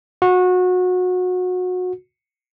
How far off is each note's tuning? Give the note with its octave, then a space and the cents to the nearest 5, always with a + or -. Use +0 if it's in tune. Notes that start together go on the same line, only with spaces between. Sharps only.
F#4 -25